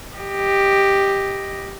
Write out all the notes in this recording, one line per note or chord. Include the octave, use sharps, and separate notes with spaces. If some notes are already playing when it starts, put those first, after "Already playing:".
G4 D#5